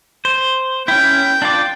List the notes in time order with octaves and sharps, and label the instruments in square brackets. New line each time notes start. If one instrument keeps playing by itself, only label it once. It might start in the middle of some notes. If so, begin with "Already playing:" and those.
[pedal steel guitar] C5
[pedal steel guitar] C#4 E4 [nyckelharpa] G5
[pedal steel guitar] D4 F4 D5